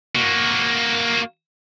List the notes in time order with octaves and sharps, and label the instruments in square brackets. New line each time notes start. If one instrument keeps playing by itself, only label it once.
[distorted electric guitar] A#3 F#4